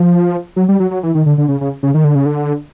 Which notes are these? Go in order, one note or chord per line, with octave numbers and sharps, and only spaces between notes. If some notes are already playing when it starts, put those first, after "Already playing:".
Already playing: F3
F#3
G3
F#3
F#3
E3
D#3
D3
D3
C#3
C#3
C#3
D#3
D3
C#3
D3